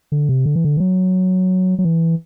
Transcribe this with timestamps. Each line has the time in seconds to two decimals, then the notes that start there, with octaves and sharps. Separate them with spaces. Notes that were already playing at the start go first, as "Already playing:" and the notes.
0.12 D3
0.29 C3
0.46 D3
0.56 E3
0.64 D3
0.77 E3
0.80 F#3
1.79 F#3
1.84 E3